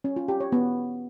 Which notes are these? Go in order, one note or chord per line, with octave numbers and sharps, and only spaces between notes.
C#4
F4
G4
C#5
B3